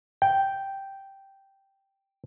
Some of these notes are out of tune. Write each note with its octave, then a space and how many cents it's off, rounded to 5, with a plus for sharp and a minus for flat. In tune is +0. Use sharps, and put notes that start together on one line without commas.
G5 -5